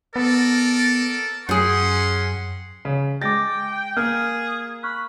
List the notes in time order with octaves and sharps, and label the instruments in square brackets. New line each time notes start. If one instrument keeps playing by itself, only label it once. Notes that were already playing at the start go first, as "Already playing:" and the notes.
[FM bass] B3 [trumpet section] A4 A#4 D5
[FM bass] F#2 [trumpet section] C#4 F#5 C6 [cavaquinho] G#4 G5
[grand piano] C#3
[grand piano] G#3 A6 [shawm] G5 [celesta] D6 A#6
[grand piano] A#3 [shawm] G#4 [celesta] F6
[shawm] B5 [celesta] C#6 F6 F#6